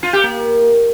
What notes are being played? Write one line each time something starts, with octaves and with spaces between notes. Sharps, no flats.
F4
G4
A#3